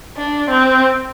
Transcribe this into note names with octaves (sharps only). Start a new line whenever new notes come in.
D4
C4